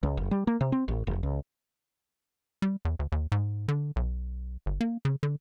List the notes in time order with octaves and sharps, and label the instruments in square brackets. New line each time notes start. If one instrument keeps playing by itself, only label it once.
[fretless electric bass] C#2
F#1
G3
A#3
C3
C4
A1
F1
C#2
[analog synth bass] G3
E2
D2
D#2
G#2
D3
B1
G1
A#3
C#3
D3